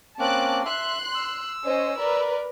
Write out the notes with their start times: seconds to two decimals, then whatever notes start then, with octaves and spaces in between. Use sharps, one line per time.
0.19 A#3 C4 C#4 A5 D6 F#6
0.65 E5 C6 F#6
1.15 E6
1.65 C#4 C5 D#5
1.98 A#4 B4 D5